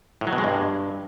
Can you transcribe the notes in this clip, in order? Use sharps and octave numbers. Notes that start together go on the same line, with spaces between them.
A2
F#3
B2
G#3
G2